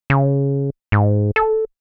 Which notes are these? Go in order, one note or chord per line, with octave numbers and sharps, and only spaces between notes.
C#3
G#2
A4